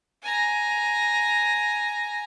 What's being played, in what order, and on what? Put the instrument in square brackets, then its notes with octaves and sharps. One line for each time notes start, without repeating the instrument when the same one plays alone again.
[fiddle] G#5 A#5